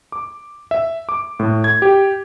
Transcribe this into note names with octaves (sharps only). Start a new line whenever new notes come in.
D6
E5
D6
A2
G#6
G4